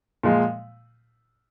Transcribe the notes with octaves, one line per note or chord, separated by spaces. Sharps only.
A#2 F3 G#3